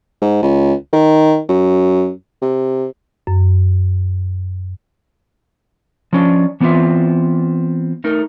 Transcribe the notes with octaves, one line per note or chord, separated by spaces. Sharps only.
G#2
C#2
D#3
F#2
C3
F#2
F3 C#4 D4
E3 B3 C4 D#4 F4 E5
A3 D#4 A#4